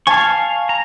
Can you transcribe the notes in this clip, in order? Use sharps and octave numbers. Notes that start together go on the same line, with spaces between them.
F5 G#5 A5 C#6
A#5